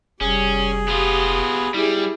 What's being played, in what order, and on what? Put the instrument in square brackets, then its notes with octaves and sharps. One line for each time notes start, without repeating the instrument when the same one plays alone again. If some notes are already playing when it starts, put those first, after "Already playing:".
[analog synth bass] F1 [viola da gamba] G3 [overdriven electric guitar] C#4 [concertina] G#4
[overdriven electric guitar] B3 F4 [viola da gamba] G4
[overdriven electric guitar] G3 [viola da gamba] E4 G4 G#4